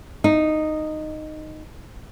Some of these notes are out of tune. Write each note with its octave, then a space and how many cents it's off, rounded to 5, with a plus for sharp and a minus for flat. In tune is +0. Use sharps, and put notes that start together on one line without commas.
D#4 -10